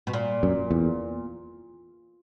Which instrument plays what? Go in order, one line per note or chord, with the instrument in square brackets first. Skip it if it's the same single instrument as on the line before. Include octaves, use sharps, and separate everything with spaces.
[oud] B2
A#2
[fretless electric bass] F#2
E2